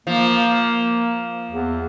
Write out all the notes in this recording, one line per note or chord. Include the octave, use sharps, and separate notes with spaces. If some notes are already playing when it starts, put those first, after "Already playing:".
F3 A#3
E2